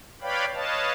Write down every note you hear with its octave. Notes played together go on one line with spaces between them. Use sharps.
B4 C#5 D5 F5 G5 B5
B4 C#5 D#5 F5 A5